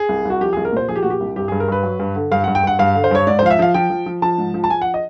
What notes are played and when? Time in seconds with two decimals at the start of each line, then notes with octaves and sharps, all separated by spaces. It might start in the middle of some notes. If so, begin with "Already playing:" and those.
Already playing: G#4
0.09 C2
0.25 C2 F#4
0.41 F3 G4
0.53 G#4
0.57 C2
0.65 A#4
0.73 A#2 C5
0.88 F3 G#4
0.96 G4
1.03 A#2 F#4
1.10 G4
1.20 C2
1.36 G2 G4
1.48 G#4
1.52 G2
1.60 A#4
1.68 G2 B4
1.83 F#3
2.00 G2
2.16 D3
2.31 G2 F5
2.44 F#5
2.48 G2
2.55 G5
2.64 G2 F#5
2.79 G2 F5
2.95 D3
3.04 C5
3.11 G2 C#5
3.27 G#2 D5
3.39 C5
3.42 F3 F5
3.50 E5
3.59 F3 F5
3.74 F3 G5
3.90 F3
4.06 F3
4.22 F3 A5
4.38 G#2
4.54 F3
4.64 A5
4.70 F3 G#5
4.82 F#5
4.94 D#5